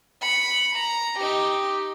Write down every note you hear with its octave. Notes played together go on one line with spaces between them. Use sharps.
B5 C#7
A#5
D#4 G4